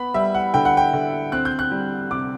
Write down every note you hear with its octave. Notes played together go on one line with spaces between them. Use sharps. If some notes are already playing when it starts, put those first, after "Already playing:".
Already playing: B3 B5
G3 E5
F#5
D3 G5
F#5
G5
D3
C4 F#6
G6
F#6
G3
C3 D6